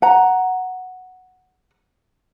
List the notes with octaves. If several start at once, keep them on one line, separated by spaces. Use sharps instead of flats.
F#5 A#5